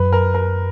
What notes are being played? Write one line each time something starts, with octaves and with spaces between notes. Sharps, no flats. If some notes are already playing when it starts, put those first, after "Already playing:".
Already playing: F#2 B4
A#4
A#4